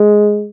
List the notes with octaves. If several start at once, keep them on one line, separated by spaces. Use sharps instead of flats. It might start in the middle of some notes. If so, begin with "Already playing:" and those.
Already playing: G#3